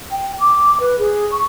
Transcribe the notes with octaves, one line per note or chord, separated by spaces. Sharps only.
G5
D6
B4
G#4
C#6